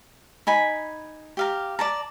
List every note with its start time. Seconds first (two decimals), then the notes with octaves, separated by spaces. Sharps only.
0.47 D#4 G#5 B5
1.37 G4 F5 A#5
1.79 D5 A5 A#5